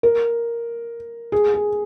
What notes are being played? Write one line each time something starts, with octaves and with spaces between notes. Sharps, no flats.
A#4
G#4
G#4